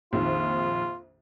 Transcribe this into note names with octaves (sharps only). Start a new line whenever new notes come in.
A#1 F2 D#3 F4